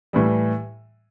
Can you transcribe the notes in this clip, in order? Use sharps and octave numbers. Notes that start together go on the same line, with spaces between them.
A2 E3 G3